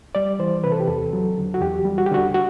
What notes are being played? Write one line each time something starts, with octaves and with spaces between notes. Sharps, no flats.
G3 D5
E3 C5
C3 B4
A4
G4
E2 A4
F#3
D3
F#4
E2 G4
G3
F#4
G4
D3 F#4
F#4